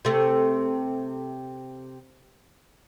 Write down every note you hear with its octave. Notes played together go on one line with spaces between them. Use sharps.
C3 A3